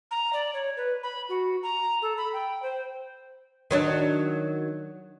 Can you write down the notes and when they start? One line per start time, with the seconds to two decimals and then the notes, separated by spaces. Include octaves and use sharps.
0.11 A#5
0.33 D5
0.54 C#5
0.77 B4
1.03 B5
1.29 F#4
1.63 A#5
2.02 A4
2.18 B5
2.33 G5
2.63 C5
3.71 D#3 F#3 D4